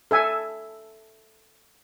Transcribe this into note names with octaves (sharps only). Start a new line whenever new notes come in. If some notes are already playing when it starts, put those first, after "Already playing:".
A4 E5 G#5